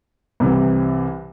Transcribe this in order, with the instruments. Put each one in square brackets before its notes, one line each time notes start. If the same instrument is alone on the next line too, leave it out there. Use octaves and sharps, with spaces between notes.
[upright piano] C2 C3 E3